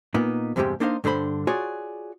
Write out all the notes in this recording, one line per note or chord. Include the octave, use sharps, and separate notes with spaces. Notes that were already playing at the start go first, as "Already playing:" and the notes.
A#2 A#3 B3 D#4
E2 G2 C3 G3 G#3 G4
A#3 D4 D#4 C5 D#5 F5
G2 D3 D4 C5 B5
F4 F#4 G#4 C#5 D5